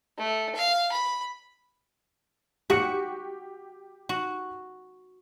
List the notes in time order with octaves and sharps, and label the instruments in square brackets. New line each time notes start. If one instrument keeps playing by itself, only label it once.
[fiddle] A3
F5
B5
[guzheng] F#4 [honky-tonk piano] G4 C#7
[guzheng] F#4